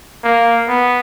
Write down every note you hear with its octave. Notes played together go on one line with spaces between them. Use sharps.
A#3
B3